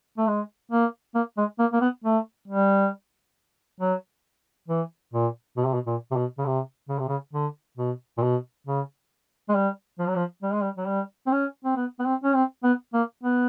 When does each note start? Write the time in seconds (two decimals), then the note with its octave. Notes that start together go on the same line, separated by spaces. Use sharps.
0.18 A3
0.27 G#3
0.72 A#3
1.15 A#3
1.38 G#3
1.59 A#3
1.73 A#3
1.81 B3
2.04 A3
2.48 G3
3.80 F#3
4.68 E3
5.14 A#2
5.57 B2
5.65 C3
5.74 B2
5.87 A#2
6.11 C3
6.16 B2
6.38 C#3
6.46 C3
6.89 C#3
6.99 C3
7.08 C#3
7.33 D3
7.77 B2
8.18 A#2
8.23 B2
8.67 C#3
9.49 G#3
9.55 G3
9.99 F3
10.08 F#3
10.16 F3
10.43 G3
10.53 G#3
10.62 G3
10.78 F#3
10.87 G3
11.27 C4
11.32 C#4
11.65 C4
11.76 B3
11.99 B3
12.05 C4
12.24 C#4
12.34 C4
12.63 B3
12.93 A#3
13.23 B3